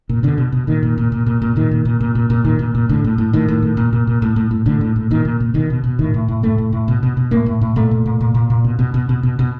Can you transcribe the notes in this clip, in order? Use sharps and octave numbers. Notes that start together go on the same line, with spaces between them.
A#2
B2 D3
B2
B2
A#2 D#3
A#2
A#2
A#2
A#2
A#2
A#2 D#3
A#2
A#2
A#2
A#2
A#2
A#2 D#3
A#2
A#2
A2 D3
A2
A2
A2 D#3
A2
A2
A#2
A#2
A#2
A2
A2
A2
A2 D3
A2
A2
A#2 D#3
A#2
A#2
B2 D#3
B2
B2
A2 D#3
A2
A2
A2 A3
A2
A2
B2
B2
B2
A2 A#3
A2
A2
A#2 A3
A#2
A#2
A#2
A#2
A#2
B2
B2
B2
B2
B2
B2